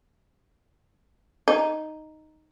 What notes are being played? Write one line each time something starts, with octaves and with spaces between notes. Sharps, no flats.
D#4